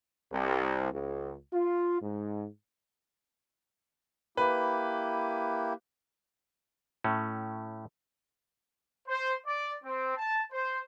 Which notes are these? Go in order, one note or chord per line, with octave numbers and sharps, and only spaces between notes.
C2
C#2
F4
G#2
A#3 E4 G4 B4
A2 A3 C#4
C5
D5
C4
A5
C5